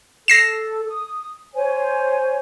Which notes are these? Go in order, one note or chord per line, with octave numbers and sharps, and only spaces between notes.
A4 A#6 C7 E7
D#6
C5 C#5 G#5